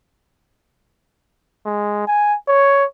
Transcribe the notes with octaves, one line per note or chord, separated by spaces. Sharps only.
G#3
G#5
C#5